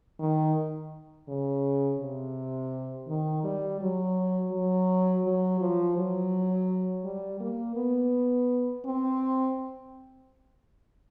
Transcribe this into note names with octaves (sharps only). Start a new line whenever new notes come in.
D#3
C#3
C3
D#3
G3
F#3
F#3
F#3
F3
F#3
G3
A#3
B3
C4